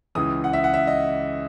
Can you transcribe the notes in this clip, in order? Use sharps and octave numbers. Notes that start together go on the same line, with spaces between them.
C#2 C#3 E3 D#6
F#5
E5
F#5
E5
D#5